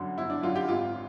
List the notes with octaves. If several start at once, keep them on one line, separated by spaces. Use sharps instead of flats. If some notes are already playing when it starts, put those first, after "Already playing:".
Already playing: G1 F#2 D3
G1 E4
D4
F#2 D3 F4
G4
G#1 F4